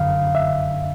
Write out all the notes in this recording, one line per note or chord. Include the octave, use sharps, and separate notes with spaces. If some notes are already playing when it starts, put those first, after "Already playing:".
Already playing: F#2 D3 F5
E5